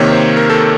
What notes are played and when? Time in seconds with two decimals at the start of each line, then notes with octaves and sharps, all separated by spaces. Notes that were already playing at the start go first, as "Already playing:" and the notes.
Already playing: C3 D#3 A#3 C#5
0.12 C5
0.37 A#4
0.50 A4
0.61 A#4